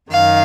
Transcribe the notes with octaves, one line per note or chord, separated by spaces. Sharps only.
F#2 D#3 F5